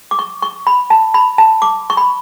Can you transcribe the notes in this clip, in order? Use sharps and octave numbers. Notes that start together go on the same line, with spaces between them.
D6
C#6
C#6
B5
A5
B5
A5
D6
C#6
B5